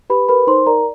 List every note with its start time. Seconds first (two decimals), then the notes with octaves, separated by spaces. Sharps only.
0.10 G4 B4 B5
0.29 A#4 B4 B5
0.47 D#4 C5 C6
0.66 A#4 D5 A#5